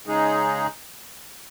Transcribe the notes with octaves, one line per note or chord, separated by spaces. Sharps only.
C#3 G#3 D#4 G#4